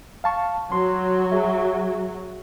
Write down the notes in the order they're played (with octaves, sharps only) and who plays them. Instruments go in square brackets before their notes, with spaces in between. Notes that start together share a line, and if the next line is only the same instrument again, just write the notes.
[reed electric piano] F5 A5 C#6
[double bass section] F#3 [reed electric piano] C6
[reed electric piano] G#4 E5